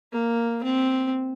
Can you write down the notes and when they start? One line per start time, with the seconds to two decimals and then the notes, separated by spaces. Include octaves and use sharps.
0.13 A#3
0.64 C4